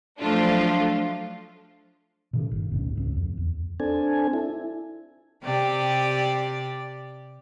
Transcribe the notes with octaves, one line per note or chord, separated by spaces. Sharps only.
F3 F#3 A3 D4 F4
B2 D#3
G1
G#1 D2 G#2 B2
F#1 C#2 C4
F2
E2
C4 D4 A4 G#5
E4
C3 G4 D5